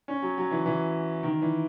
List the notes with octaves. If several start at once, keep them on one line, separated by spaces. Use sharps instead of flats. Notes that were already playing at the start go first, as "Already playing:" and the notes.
C#4
F#3
F#3
E3
E3
D#3
E3